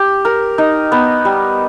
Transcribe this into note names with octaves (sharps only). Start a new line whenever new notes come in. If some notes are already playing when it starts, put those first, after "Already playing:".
Already playing: G4
A#4
D#4
B3
G3